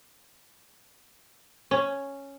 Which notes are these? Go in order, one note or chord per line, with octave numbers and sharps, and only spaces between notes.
C#4